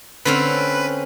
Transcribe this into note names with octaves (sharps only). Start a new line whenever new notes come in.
D3 C4 C#4 B4